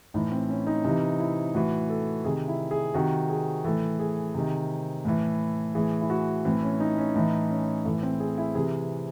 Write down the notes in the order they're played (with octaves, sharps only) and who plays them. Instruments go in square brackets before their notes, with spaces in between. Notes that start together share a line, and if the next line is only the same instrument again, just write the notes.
[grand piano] A2 E3 D#4
C4
C#4
D#4
C3 E3 D#4
E4
A2 E3 F#4
A4
C3 D#3 G#4
E4
G#4
C3 D#3 F#4
G#4
A2 E3 A4
G#4
C3 D#3
A2 E3
A2 E3 G#4
E4
F#4
A2 E3 C4
C#4
D#4
C#4
A2 E3 D#4
C#4
A2 E3 A3
C4
G#4
E4
C3 E3 G#4